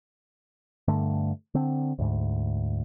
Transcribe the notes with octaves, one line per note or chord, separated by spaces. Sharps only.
G2 D3 A3
D3 C4
D2 G#2